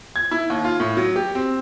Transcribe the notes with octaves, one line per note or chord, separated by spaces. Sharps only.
G#6
E4
D#2
F4
A2
F#3
G4
C4